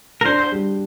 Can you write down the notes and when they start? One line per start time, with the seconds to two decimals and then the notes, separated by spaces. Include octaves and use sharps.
0.21 A#4
0.25 D4 C5
0.52 G3